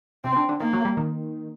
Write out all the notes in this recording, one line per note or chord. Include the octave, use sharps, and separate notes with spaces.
C3 C4
D3
D3
D#3 A#3
F#3
G3
D#3